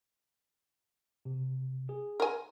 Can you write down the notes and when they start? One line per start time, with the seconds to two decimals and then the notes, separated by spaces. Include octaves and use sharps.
1.25 C3
1.89 G#4
2.20 A#4 G#5